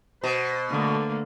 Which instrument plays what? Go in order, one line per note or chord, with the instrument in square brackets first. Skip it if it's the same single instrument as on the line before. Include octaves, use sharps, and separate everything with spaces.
[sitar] B2 [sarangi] C5
[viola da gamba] D3 A3 [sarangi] A#3